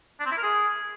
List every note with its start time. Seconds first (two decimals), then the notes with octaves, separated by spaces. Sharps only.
0.20 D4
0.26 C4
0.32 E4
0.37 A#4
0.43 G#4